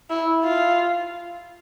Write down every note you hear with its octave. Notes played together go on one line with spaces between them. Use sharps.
E4
F4